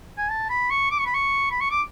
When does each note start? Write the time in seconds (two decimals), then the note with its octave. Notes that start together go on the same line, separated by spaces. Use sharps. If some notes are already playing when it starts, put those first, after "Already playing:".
0.18 G#5
0.30 A5
0.49 B5
0.70 C#6
0.91 D6
0.99 C#6
1.06 B5
1.14 C#6
1.51 B5
1.61 C#6
1.71 D6